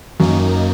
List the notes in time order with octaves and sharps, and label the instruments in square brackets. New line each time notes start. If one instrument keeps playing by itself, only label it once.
[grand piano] F#2 [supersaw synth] D#3 A#3 D#4